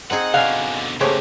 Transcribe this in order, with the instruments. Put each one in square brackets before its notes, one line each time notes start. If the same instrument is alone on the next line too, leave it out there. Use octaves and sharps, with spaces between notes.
[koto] C4 D#4 G#4 [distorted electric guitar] F#5
[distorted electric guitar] B2 D3 [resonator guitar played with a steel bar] F5 [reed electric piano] F#5 G#5
[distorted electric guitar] C#3 A#3 [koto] A3 G4 [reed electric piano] G#4 C5 C#5